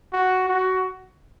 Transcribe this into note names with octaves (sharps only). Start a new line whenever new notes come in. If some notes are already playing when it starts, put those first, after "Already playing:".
F#4
F#4